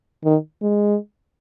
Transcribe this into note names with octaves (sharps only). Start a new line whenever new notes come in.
D#3
G#3